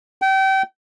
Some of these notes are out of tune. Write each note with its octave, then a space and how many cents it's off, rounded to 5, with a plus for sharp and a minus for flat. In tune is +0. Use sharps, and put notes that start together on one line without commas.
G5 -30